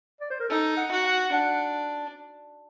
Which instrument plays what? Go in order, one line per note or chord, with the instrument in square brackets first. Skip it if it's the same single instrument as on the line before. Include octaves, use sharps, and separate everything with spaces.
[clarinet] D5
C5
A#4
[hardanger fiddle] D#4 [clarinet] A4
[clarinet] F#5
[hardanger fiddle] F#4
[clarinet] F#5
[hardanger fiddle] D4 [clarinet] F#5